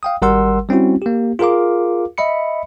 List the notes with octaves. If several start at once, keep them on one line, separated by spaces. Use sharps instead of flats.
F5 G5 D#6
G#1 G3 A#4 F#5 C6 E6
G3 C4 C#4 E4 F#4
A#3 G4
F4 G#4 A#4 F5 D6
D#5 E5 B5 C#7